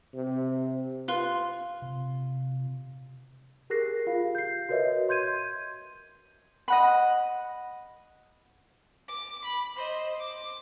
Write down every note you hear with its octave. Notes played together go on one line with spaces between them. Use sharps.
C3
F4 B4 C6 F#6
C3
G4 G#4 A#4 F#6 A#6 C7
F4 F5
G6 C7
F#4 A#4 B4 C#5 D#5 E5
C6 G6 G#6 D#7
D#5 F#5 B5
D6
B5
C5 D#5
D6